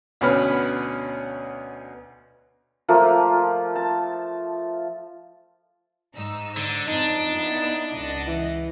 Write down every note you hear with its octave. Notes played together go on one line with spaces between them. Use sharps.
D2 B2 C#4 B4 B5 F6
F3 A3 A#3 F4
A5
G#2 D#4 E6
D3
F2 D4 D#4
B3 E4
C#2 D#5 F#5
E3